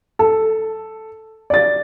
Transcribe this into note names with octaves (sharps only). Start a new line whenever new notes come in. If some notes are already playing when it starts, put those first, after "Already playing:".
A4
D5 A6